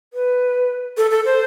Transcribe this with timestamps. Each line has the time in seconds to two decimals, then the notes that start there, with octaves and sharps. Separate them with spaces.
0.13 B4
0.97 A4
1.11 A4
1.25 C5